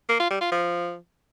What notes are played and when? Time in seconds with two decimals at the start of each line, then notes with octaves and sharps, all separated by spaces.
0.09 A#3
0.20 F4
0.30 G3
0.41 F4
0.51 F3